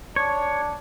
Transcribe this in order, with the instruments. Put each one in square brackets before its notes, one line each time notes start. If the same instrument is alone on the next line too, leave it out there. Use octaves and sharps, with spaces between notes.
[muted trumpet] D4 [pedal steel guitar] C#5